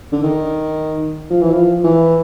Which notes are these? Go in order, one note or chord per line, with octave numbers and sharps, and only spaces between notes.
D3
D#3
F3
E3
F3
E3